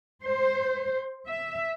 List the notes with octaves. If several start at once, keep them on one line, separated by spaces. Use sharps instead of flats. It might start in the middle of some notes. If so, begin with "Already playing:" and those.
C5
E5